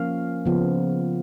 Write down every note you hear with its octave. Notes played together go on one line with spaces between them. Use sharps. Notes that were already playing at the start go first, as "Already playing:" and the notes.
Already playing: F3 A#3 C#4 F5
C#3 F3 B3